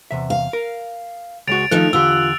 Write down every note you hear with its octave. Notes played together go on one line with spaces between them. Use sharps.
E2 C3 E5
F5
A#4
C#2 G#3 F#4 A6 D7 F7
D#3 F3 A3 D#4 A4 F#6
E2 D3 F4 G4 E6